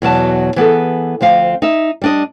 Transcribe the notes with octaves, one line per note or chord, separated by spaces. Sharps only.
E2 B2 F#3 A5
E3 B3 G#4 A4
D2 F3 C4 F5
D#4 E5
G3 D4 D#5